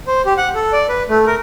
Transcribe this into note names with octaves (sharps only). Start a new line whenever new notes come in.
C5
G4
F#5
A4
D5
B4
A3
A#4